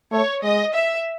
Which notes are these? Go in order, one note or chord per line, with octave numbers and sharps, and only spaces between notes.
A3 C#5
G#3 D#5
E5